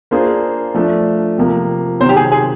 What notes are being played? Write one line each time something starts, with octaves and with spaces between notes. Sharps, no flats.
A#3 D4 F4 G#4 C5
F3 A3 D4
C3 F3 A#3
C3 D#3 F#3 C5
G4
G#4
G#4